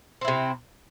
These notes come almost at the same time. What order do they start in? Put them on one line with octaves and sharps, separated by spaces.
C4 E4 C3